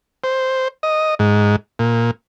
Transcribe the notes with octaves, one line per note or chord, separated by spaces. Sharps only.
C5
D#5
G#2
A#2